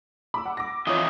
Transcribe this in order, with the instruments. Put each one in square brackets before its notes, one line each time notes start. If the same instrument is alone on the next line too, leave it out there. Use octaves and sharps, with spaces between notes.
[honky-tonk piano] B5 D6 E6
F#5
D6 A#6
[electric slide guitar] F2 E3 D#5 [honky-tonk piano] F4 C#5